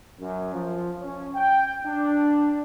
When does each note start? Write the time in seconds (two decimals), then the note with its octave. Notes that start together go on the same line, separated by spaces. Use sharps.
0.20 F#2
0.53 F3
1.01 C#4
1.35 G5
1.87 D4